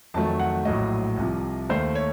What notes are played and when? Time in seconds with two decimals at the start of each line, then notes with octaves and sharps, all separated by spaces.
0.14 F2 D#3 F#3 A3 A5
0.40 F#5
0.65 A#1 A2 F#3 A3 D#5
1.17 C2 C3 F3
1.69 D#2 D#3 A3 C5
1.95 C#5